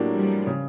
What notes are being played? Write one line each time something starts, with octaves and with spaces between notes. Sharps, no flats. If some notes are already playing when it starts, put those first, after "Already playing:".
Already playing: A2 F#3 A#3 D4 G4
F3 G3
C#3